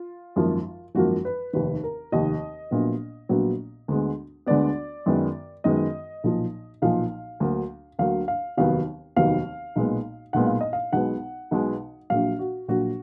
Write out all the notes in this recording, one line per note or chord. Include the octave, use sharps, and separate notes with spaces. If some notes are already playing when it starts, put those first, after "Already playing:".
Already playing: F4
G#1 F#2 F3 A#3
G#1 F#2 F3 A#3 F#4
B4
F1 D#2 D#3 B4
A#4
F1 D#2 D#3 D#5
A#1 A#2 F#3 B3
A#1 A#2 F#3 B3
D2 D3 G#3 B3
D2 D3 G#3 B3 D5
F#2 D#3 G#3 B3
F#2 D#3 G#3 B3 D#5
B1 A#2 F3
B1 A#2 F3 F5
D2 D3 F#3 A#3
D2 D3 F#3 A#3 F5
F5
F1 D#2 D#3 F#3 B3 F5
F1 D#2 D#3 F#3 B3 F5
B1 A#2 G#3 B3
B1 A#2 G#3 B3 F#5
F5
D#5
F5
B1 B2 G#3 B3 F#5
B1 B2 G#3 B3
A#1 A#2 F#3 F5
F#4
A#1 A#2 F#3 F#4